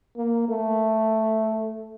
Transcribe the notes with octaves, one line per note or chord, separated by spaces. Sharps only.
A#3
A3